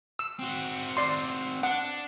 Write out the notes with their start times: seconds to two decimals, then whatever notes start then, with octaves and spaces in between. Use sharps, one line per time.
0.19 E6
0.39 C4 F#4
0.97 D5 C6
1.63 D4 F#5